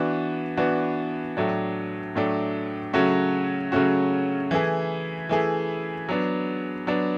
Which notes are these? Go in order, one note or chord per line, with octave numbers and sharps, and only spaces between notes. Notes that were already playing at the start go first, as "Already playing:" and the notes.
Already playing: E3 B3 D4 F#4
E3 B3 D4 F#4
A2 F#3 A3 D4
A2 F#3 A3 D4
C#3 F#3 A3 C#4 F#4
C#3 F#3 A3 C#4 F#4
E3 A3 E4 G#4
E3 A3 E4 G#4
F#3 B3 D4
F#3 B3 D4